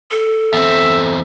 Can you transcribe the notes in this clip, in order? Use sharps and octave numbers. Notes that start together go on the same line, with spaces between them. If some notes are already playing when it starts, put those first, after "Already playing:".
A4
E2 C4 E5